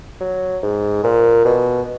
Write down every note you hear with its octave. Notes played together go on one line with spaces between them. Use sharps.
F#3
G#2
A#2
B2